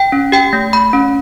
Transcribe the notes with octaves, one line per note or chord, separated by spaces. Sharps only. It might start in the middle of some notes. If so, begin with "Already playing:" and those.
Already playing: G5
C#4
G4 G5
A3
A3 B5
C#4